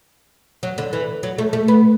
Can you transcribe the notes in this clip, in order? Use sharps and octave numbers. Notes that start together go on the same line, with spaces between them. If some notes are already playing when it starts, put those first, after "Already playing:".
F#3
D3
E3
F#3
A3
A3
B3